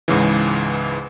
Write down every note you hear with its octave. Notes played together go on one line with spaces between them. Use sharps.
C#2 G#2 C#3 E3